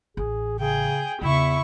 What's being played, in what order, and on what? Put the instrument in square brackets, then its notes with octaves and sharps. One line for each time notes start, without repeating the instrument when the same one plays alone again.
[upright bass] A1 [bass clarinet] G#4
[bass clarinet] C#3 [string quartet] G#4 G5
[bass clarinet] E2 [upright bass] C#3 D#4 [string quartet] E4 E5 C#6